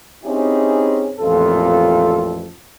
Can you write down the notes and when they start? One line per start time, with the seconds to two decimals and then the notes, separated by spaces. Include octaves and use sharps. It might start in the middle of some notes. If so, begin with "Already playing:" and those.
0.24 C4 C#4 D#4 E4 G4 G#4
1.20 A1 F2 A#2 C4 F4 A4